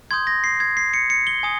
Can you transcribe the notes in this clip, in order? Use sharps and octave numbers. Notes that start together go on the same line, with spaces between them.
C6 D#6 G6 G#6
A#6
C7
G#6
C7
C#7
C#7
G7
G#5 D#6